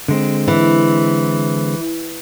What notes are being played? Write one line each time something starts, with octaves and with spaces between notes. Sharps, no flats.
D3 G#3 C4
E3